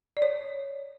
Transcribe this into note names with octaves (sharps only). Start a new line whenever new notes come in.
D5
C#5